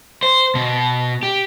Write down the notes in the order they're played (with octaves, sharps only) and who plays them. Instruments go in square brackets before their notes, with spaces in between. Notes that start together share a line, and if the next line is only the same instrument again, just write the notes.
[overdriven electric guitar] C5
B2
G4